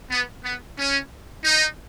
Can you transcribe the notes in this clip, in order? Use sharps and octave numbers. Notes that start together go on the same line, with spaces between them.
B3
B3
C#4
D#4